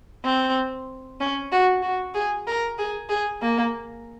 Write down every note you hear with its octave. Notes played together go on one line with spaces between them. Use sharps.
C4
C#4
F#4
F#4
G#4
A#4
G#4
G#4
A#3